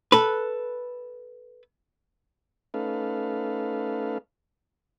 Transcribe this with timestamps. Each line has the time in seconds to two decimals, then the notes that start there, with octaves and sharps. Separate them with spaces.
0.12 A4 B4
2.74 A3 C#4 D#4 A4 B4 F5